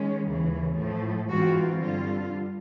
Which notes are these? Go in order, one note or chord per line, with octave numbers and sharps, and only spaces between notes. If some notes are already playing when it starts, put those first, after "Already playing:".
Already playing: D#3 G#3 C#4
D#2 C#3 E3
A2 F3 A3
G#2 E3 G#3 C4 F4 F#4
G2 D3 G3 F4